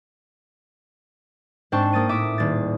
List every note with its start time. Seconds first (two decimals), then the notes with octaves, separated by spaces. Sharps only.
1.72 G#2 C4 D4 G5 A5 C#6
1.93 A#3 D#6 A6 D#7
2.09 A2 E5 D6 D#6
2.38 D#1 A6